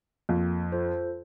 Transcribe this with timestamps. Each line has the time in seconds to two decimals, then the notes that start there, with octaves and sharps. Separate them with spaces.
0.29 F2 A#3
0.72 F4 A4 C5